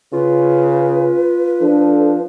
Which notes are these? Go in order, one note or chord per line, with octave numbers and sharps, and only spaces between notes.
C#3 F4 B4
F3 D4 A4